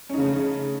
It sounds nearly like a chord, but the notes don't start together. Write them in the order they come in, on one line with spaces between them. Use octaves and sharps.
C#4 D#4 C#3 A3